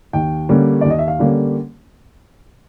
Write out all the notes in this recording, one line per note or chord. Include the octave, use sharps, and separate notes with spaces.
D#2 G5
D3 G3 A#3 C#4
D#2 D5
D#5
E5
F5
D3 G3 A#3 C#4